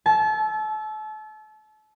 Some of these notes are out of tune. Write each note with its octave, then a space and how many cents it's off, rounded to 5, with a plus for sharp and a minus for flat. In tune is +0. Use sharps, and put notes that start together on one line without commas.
A5 -35 E6 +0